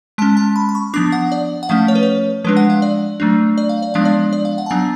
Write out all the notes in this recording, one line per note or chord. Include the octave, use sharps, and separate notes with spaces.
G#3 C#4 A5
A5
B5
B5
C#6
F3 B3 D4 D6
F#5
D5
F#5
F3 A3 C#4 F5
C#5
B4
C#5
F3 G#3 D4 B4
F#5
F5
D5
F#3 A3 D4
D5
F5
D5
F3 G#3 B3 D4 F5
D5
D5
F5
F#5
A5
F#3 B3 D4 G#5